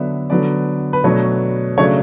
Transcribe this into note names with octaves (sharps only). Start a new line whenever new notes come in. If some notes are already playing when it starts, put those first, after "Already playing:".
Already playing: D3 F#3 B3 D4 E5
D3 F#3 B3 D5
B4
B2 F#3 A3 D4 C#5
C#3 F#3 A3 D4 C#5